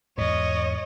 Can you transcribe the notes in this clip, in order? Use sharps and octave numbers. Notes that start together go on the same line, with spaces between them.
E2 G#2 C#5 D#5